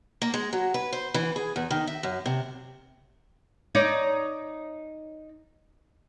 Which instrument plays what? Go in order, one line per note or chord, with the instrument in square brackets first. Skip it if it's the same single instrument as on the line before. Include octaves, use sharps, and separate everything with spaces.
[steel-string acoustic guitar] A#3
G#3
F#3
B4
C5
E3
G#4
E2
D#3
E5
F#2
C3
[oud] D#4 C#5 D5